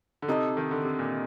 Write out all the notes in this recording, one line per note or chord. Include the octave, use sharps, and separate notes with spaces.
D3
C3 D#4 A4 D#5
D#3
D3
C3
A#2